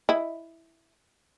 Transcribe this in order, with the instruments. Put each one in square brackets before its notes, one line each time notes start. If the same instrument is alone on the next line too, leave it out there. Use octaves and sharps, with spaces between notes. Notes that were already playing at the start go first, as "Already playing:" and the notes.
[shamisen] E4 D#5